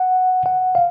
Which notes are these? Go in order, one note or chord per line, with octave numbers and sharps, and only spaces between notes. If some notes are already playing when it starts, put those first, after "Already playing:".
Already playing: F#5
F#5
F5